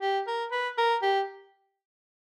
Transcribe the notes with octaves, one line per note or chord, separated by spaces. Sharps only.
G4
A#4
B4
A#4
G4